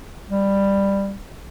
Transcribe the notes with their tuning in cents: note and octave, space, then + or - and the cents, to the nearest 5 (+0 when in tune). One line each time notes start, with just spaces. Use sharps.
G3 +10